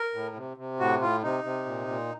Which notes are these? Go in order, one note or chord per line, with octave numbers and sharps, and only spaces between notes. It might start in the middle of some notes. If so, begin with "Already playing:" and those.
Already playing: A#4
A2
C3
C3
A2 F#4
A2 F4
C3 D#4
C3
A#2
A#2